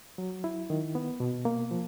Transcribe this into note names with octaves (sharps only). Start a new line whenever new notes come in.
F#3
E4
D#3
B3
B2
A#3
F3